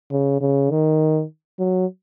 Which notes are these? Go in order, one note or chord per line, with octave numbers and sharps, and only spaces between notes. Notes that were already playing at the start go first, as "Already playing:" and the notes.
C#3
C#3
D#3
F#3